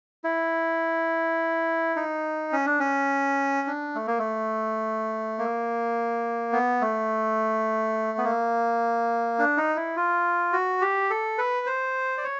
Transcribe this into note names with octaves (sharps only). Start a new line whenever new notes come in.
E4
D#4
C#4
D4
C#4
D4
A3
A#3
A3
A#3
B3
A3
B3
A#3
D4
D#4
E4
F4
F#4
G4
A4
B4
C5
D5
C#5